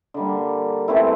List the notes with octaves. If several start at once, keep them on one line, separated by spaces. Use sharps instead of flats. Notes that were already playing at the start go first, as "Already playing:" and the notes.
D3 G3 A#3
E3 A3 C4 E4